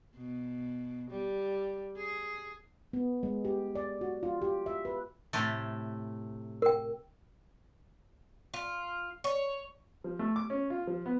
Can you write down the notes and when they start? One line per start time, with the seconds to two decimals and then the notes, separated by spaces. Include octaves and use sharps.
0.16 B2
1.10 G3
1.97 G#4
2.93 B3
3.23 G#3
3.45 G4
3.75 D5
4.01 F#4
4.23 F4
4.42 G4
4.66 E5
4.85 B4
5.33 A2 C3 A3
6.62 A#4 G5
8.54 F4
9.24 C#5
10.04 F3
10.19 A3
10.36 D6
10.50 C#4
10.70 F4
10.87 F3
11.06 B3